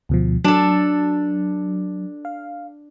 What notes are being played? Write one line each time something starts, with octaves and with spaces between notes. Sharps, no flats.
D2 B2 F3
F#3 D4 A4
F5